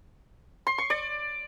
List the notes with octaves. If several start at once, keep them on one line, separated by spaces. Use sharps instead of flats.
C6
C#6
D5